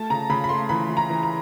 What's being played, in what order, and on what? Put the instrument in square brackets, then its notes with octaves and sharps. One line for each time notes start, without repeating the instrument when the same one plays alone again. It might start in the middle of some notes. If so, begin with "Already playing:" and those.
Already playing: [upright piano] A3 A5
C#3 A#5
C#3 B5
B5
A3 C6
E3 B5
E3
A#5
E3
A#5